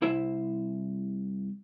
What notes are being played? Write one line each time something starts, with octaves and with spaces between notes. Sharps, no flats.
C2 E4 C5 E5